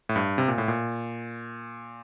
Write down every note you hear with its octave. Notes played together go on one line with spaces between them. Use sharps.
A2
G2
C3
A#2
A2
A#2